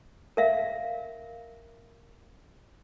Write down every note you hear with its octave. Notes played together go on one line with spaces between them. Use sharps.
A#4 E5 F5